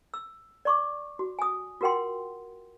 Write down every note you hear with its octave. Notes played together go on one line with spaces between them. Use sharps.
E6
D5 C#6 D6
F#4
G#5 D#6
F4 F#4 A#4 F#5 G5 C6